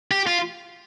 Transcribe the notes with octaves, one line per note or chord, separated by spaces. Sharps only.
G4
F4